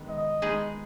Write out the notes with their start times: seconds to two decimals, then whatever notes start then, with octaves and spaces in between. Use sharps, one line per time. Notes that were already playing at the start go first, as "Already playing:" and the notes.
Already playing: D#3 G#3 B3
0.09 D#5
0.42 G#3 B3 D#4 G#4